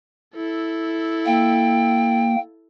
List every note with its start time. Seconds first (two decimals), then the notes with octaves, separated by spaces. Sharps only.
0.36 E4 A4
1.26 A#3 G5